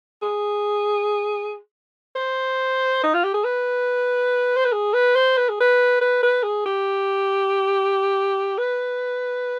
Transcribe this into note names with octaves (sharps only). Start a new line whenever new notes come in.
G#4
C5
D#4
F4
G4
G#4
B4
C5
B4
G#4
B4
C5
B4
G#4
B4
B4
B4
G#4
G4
B4